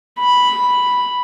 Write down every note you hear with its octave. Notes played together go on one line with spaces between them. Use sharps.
B5